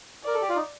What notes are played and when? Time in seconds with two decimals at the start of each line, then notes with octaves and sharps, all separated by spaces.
0.24 A#4 D5
0.35 A4
0.42 G4
0.49 F4
0.56 D#4